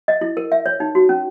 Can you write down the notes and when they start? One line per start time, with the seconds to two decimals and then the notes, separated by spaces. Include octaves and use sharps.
0.08 D#5
0.21 E4
0.37 A#4
0.52 E5
0.66 C#5
0.80 D#4
0.95 F#4
1.09 C#4